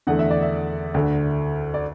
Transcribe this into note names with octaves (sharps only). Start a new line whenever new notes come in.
E2 D3 A3 F#5
E5
D5
E5
D2 D3 A3
D5